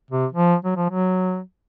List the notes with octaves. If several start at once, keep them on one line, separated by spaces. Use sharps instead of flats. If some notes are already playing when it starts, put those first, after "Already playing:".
C3
F3
F#3
F3
F#3